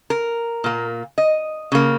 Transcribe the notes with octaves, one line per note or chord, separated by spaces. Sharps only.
A#4
A#2 A#3
D#5
C#3 A#3